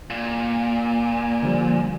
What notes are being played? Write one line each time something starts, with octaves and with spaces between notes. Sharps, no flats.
A#2
D3 F3 G3